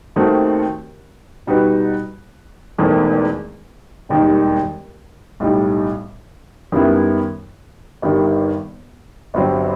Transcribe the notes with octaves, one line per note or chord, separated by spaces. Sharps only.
D#2 D#3 A3 C4 F#4
B2 G3 D#4 F#4 B4
E1 E2 D#3 A3 C4
E1 D#2 D#3 G3 D#4
B1 A2 G3 D#4
F#2 D#3 G3 B3 E4
G1 G2 D#3 G3
G1 G2 F#3 C4